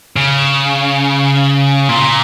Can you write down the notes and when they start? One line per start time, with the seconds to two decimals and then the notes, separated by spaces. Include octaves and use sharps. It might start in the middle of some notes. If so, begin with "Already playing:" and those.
0.17 C#3
1.89 A#2